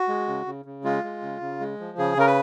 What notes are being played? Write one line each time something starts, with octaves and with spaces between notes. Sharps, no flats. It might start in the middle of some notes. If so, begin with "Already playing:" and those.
Already playing: F#4
G#3
C#3
C#3
C#3
G#3 F4
G#3
C#3
C#3
G#3
F3
C#3 G#4
C#3 A#4
B4